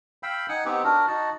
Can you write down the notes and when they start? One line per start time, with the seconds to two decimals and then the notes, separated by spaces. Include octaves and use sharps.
0.23 F5 G5 B5 E6
0.49 D#4 F#5 G#5
0.65 B3 C4 D#4 G4
0.84 D4 F#4 A#4
1.07 D#4 F#4 A5